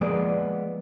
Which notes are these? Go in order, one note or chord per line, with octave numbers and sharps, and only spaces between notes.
F3 G#3 A#3 B3 G#4 D5